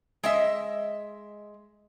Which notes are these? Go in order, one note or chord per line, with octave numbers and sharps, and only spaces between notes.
G#3 D#5 E5